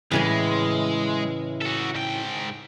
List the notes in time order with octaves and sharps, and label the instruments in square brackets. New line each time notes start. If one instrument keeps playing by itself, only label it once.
[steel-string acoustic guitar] A2 C#3 E3 [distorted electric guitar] G#3
[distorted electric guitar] F#4 A4
G#2 G5